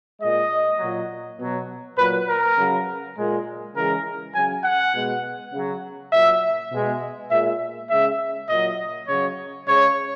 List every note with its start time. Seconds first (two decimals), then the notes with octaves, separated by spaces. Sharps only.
0.20 A#2 G#3 D#5
0.80 A#2 F#3
1.39 B2 F#3
1.98 A#2 F#3 B4
2.28 A#4
2.57 C#3 F#3
3.17 A#2 G#3
3.75 C#3 E3 G#3 A#4
4.34 C#3 F#3 G#5
4.64 F#5
4.94 B2 G#3
5.53 C#3 F#3
6.12 A#2 F#3 E5
6.71 B2 G#3
7.30 A#2 G#3 E5
7.89 C#3 G#3 E5
8.49 A#2 F#3 D#5
9.08 C#3 F#3 C#5
9.67 C#3 G#3 C#5